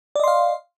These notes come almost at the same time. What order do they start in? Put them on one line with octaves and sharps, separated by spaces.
D5 D#5 C6 F5